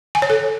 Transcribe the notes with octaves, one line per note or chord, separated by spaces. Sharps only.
G#5
C#5
A4